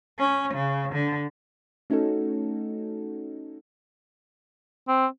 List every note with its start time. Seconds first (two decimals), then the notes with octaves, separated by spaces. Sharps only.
0.19 C#4
0.54 C#3
0.93 D3
1.90 A3 C#4 D#4 F#4 A4
4.88 C4